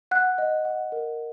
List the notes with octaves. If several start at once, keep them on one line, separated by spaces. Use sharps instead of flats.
F#5 F#6
D#5
F#5
A#4